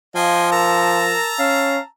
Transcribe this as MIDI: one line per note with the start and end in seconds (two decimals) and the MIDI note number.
0.16 1.19 53
0.16 0.52 75
0.16 0.49 77
0.16 0.52 79
0.16 0.52 80
0.52 1.33 70
0.52 1.85 81
0.52 1.85 82
0.52 1.85 88
1.39 1.78 61
1.39 1.80 77